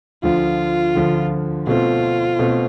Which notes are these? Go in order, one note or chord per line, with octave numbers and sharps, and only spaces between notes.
D2 D3 F3 F4
D2 D3 F3
B2 A3 C4 F4
B2 A3 C4